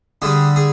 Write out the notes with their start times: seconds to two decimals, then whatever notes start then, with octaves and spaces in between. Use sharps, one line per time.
0.22 D3 G3 G#4
0.56 G#4